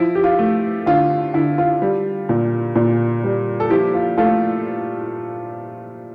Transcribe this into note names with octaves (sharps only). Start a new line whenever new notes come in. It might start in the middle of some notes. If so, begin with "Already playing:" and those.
Already playing: F3 E4
G4
F4
A3
D3 F4
D3 E4
F4
G3
A#2
A#2
G3
A4
F3 E4 G4
F4
A3 F4 A4